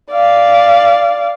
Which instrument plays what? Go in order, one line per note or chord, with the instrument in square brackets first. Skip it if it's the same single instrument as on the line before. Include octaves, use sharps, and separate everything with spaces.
[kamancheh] D5 F5